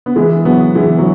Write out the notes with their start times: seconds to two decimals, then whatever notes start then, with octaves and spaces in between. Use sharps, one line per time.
0.06 B3
0.16 E3 G#3
0.45 F#3 B3
0.75 E3 G#3
0.98 F#3